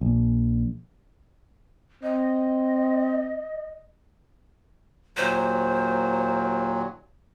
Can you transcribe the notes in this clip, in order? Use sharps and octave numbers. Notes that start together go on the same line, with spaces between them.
A#1
C4 D#5
D#2 A#2 F#3 C5